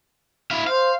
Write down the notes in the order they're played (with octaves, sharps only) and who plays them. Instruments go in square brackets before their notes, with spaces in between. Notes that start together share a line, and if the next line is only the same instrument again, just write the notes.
[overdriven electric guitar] E4 F5
[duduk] C5 [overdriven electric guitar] F5